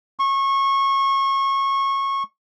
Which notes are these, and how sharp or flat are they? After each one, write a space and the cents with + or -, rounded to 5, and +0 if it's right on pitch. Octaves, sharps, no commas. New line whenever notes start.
C#6 -25